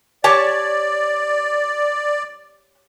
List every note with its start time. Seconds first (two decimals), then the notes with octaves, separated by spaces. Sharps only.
0.24 G4 C#5 D5 A5